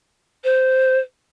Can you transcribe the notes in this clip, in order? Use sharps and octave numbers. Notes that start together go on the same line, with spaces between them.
C5